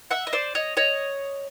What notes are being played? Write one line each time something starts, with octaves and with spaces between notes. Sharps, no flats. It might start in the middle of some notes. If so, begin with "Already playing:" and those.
E5 F#5
D#5
C5 D5
C#5 D#5
C#5 D#5